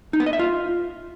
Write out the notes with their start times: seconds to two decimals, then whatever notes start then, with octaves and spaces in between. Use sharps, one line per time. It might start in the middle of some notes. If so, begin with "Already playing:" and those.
0.13 D#4
0.20 B3
0.26 D#5
0.33 E5
0.39 F4